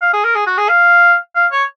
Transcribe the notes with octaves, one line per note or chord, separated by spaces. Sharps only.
F5
G#4
A#4
G#4
F#4
G#4
F5
F5
C#5